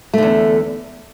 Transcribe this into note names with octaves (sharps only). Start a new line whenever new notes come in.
E2 D3 A3